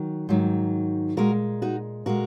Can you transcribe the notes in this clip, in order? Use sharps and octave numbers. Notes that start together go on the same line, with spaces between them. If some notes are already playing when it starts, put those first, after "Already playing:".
Already playing: D#3 F#3
G#2 D#3 F#3
A#2 G#3 F#4 A#4
D#4 F#4
A#2 G#3 F#4 A#4